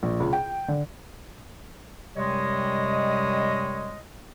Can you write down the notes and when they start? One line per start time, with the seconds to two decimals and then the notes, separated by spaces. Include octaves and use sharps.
0.03 A#1
0.20 C#2
0.33 G5
0.68 D3
2.16 F#2 C3 G3 G#3 C#5 D#5